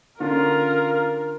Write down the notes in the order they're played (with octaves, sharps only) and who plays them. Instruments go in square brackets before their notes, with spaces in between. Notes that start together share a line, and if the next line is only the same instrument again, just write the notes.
[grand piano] D3 C#4 D4 [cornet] F4 [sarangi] A#4